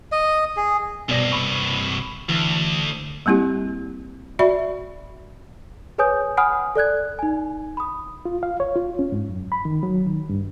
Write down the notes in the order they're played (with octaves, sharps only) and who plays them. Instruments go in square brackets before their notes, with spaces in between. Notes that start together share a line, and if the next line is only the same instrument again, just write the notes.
[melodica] D#5
G#4
[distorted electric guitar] C2 G2 [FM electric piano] B2 D5 A#6
[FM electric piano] B5 C#6
[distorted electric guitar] D2 [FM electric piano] E3
[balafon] G3 A#3 C4 E4 G4
F#4 D5 E5 B5
[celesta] G#4 B4 C#5 G#5 D#6 G6
F#5 G#5 B5 D#6 F6
A4 D5 F#6 G#6
D#4 G#5
B5 D#6
[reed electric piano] F4
F5
C#5
F4
C#4
G#2
F#2
B5
D#3
F#3
D#3
G2